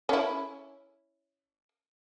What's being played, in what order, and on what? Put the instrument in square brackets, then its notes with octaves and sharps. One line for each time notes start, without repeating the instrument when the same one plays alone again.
[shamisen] C#4 E4